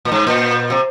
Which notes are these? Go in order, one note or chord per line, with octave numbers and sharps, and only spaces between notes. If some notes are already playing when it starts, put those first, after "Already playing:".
A#2
G#2
A#2
C3